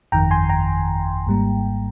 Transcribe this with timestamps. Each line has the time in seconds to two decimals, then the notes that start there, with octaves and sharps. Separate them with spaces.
0.12 G1 F2 D#3 G5 A#5
0.31 G#5 C6
0.49 G5 A#5
1.26 G#1 G#2 G3 A#3